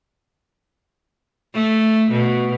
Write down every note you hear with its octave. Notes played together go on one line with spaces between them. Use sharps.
A3
B2